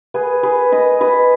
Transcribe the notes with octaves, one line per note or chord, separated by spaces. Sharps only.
G#4 B4
G#4 B4
B4 D#5
B4 D#5